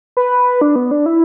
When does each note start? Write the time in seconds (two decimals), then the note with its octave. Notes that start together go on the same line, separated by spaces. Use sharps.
0.17 B4
0.61 D4
0.76 B3
0.91 D4
1.06 E4